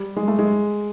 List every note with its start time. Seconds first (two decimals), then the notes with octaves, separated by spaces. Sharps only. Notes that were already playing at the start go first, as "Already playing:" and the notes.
Already playing: G3
0.16 G#3
0.28 A3
0.39 G#3